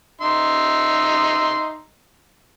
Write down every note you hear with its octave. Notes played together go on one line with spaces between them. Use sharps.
D#4 E5 C6